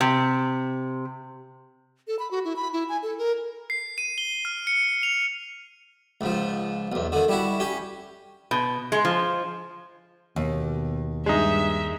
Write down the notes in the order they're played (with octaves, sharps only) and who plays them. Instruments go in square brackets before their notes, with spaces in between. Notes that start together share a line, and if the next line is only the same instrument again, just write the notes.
[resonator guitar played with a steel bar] C3
[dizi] A4
B5
F#4
E4
B5
E4
G#5
A4
A#4
[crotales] C7
D#7
G7
F6
C#7
F7
[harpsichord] C#2 G#2 F3
B1 E2
D3 D#3
G3 E4 F#4
C#4 G4
[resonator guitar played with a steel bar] B2
G#3
F3
[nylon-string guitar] D#2 [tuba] B2
[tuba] G2 [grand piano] G#3 D#4 [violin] E5